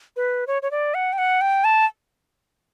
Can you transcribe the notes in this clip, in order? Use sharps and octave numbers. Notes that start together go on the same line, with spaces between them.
B4
C#5
C#5
D5
F#5
G5
F#5
G5
A5